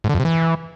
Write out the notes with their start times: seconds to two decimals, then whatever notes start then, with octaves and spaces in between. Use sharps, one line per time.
0.04 G#2
0.09 D3
0.15 F2
0.20 C3
0.25 E3